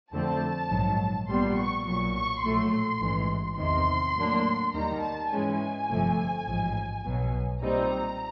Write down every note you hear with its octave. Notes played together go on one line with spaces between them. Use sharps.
F2 D3 F3 A3 C4 A5
A#1 G#2 D#3 F#3
A#1 A#2 G3 B3 C6
C#6
B1 A#2 F#3 C#6
C#6
A#1 A2 F#3 A3 C6
A1 G#2 E3
E2 C3 D#3 C6
A2 F#3 A#3 D4
D#2 D#3 G3 A#5
A5
G#2 E3 G#3 C#4 G#5
G1 F2 C3 F3 A3
A1 G#2 F3
B1 B2 F#3
A#2 G3 C4 D#4 A#5